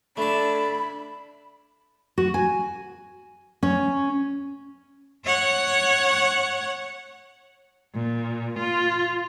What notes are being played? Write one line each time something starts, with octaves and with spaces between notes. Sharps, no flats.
A3 D4 A5 B5
F#4
G#5
C#4
C#5 F#5
A#2
F4